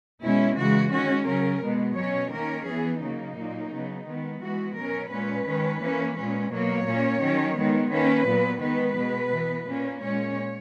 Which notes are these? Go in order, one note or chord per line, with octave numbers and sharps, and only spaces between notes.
B2 G#3 C#4 E4
C#3 E3 G#3 F#4
D#3 G#3 C#4 F#4
C#3 F#3 C#4 A#4
B2 G#3 B3
B2 F#3 C#4 C#5
D#3 A#3 C#4 A#4
E3 B3 G#4
C#3 F#3 A#3 D#4
A#2 F#3 A#3
C#3 F#3 B3
D#3 G#3 B3
E3 G#3 B3 F#4
B2 F#3 C#4 A#4
A#2 G#3 C#4 B4
D#3 G#3 C#4
E3 A#3 C#4
A#2 G#3 C#4
B2 F#3 A#3 C#5
A#2 A#3 C#4
D#3 F#3 C#4
D#3 G#3 B3
D#3 A#3 C#4 B4
A#2 F#3 B3
D#3 G#3 B3 B4
B2 G#3 B3
E3 B3
A#2 A#3 C#4
A#2 G#3 C#4 C#5